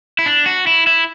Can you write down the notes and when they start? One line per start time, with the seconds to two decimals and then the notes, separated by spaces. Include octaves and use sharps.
0.19 E4
0.26 D4
0.46 F#4
0.67 E4
0.87 E4